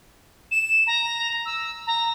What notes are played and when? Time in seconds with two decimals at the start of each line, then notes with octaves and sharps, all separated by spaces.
0.51 E7
0.87 A#5
1.46 E6
1.87 A#5